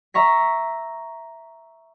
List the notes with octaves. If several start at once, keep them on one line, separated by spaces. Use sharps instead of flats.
E5 A#5 C#6 B6